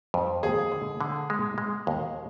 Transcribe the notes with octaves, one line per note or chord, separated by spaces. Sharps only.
F2
D#2 G#4
D3
D3
G#3
G#3
D#2